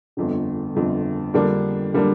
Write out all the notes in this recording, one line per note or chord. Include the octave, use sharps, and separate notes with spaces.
G1 F2 D3
G1 F2 D3
F2 D3 G3 A#3 D4
D3 G3 A#3 D4